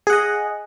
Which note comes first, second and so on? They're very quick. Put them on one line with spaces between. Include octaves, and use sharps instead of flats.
G#4 F#5 D#5